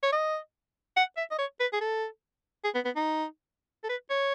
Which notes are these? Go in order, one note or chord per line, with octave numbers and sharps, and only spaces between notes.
C#5
D#5
F#5
E5
D#5
C#5
B4
G#4
A4
G#4
B3
B3
D#4
A4
B4
C#5